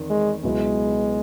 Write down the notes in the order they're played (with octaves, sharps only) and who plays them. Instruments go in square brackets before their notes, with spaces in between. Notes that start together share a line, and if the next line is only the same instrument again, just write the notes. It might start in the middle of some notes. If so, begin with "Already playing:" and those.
Already playing: [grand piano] E2 D#3 C4
[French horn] G#3
[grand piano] C#2 B2 F#3 B3 E4 [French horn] G#3